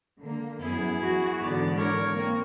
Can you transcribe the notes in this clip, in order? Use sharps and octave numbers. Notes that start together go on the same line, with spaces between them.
D3 A#3
F#2 B3 E4 G#4
F#4
G#2 D3 E3 B3 D5
A#4 C#5
A#3 C4